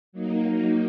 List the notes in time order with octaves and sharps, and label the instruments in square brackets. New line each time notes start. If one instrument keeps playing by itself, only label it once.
[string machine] F#3 A#3 D#4